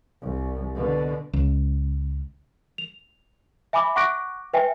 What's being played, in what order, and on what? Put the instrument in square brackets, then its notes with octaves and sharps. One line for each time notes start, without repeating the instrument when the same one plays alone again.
[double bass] C2
B2 D3
[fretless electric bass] C#2
[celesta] F7
E5 G#5 B5 D6
F#5 C#6 D6 F#6 A#6 D7
B4 E5 G5 G#5